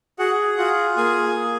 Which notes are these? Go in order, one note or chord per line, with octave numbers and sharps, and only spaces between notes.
F#4 G#4 F#5
F4 F#4 F#5
A#3 G#4 G#5
G#4